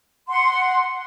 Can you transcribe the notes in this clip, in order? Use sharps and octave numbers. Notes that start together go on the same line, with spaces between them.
F#5 C6